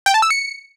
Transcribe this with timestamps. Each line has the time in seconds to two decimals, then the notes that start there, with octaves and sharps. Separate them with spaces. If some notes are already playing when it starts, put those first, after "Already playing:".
0.06 G5
0.14 A5
0.22 E6
0.31 C#7